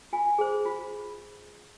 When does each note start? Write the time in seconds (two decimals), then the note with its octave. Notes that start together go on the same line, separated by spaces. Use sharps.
0.13 F4 G#5
0.38 G#4 C5
0.65 F4